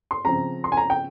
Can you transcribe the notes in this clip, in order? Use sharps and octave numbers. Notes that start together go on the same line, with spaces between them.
C6
C#3 F3 C4 A#5
C6
G#5
A#5
G5